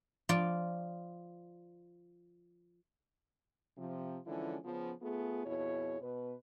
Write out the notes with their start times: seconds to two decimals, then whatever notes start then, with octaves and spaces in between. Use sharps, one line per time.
0.29 F3 F4 D5
3.77 C3 F3
4.26 D3 E3 F3 G#3 C#4 E4
4.64 C#3 F3 B3
5.02 A3 B3 F4 G#4
5.46 F2 B2 E4 G#4 C#5
6.01 B2 B4